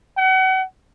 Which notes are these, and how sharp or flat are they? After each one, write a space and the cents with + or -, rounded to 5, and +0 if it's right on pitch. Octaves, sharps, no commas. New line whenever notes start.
F#5 +35